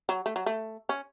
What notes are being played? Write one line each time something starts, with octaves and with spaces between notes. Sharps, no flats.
F#3
A3
F#3
A3
C#4